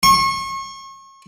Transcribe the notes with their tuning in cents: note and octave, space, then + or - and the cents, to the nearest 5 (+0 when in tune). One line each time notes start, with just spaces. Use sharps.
C#6 -35